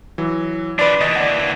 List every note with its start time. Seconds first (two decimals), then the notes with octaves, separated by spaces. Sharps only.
0.18 E3 F#3
0.79 F3 D4 B4 D5
1.01 D#2 E3 D#5 A6
1.16 D5 F#5